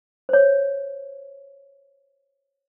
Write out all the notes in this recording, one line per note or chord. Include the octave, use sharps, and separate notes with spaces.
C5 C#5